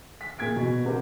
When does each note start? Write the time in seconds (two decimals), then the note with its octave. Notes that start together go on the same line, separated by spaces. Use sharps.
0.21 B6
0.38 A#2 G#4 G#6 B6 D7
0.56 B2
0.85 C3 B3 C4 G4 A#4 F#5